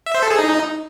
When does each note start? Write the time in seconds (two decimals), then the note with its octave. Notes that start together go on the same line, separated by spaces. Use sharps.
0.06 E5
0.14 C5
0.22 A4
0.30 G#4
0.38 D#4